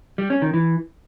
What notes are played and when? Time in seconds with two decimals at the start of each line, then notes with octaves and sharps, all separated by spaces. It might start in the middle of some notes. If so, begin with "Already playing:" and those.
0.18 G3
0.30 C#4
0.42 D#3
0.54 E3